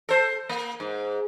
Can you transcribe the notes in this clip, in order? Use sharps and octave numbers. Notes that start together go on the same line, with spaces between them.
A4 C5
A#3
G#2